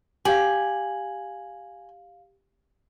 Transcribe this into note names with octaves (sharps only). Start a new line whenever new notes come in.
G4 F5 G#5 F#7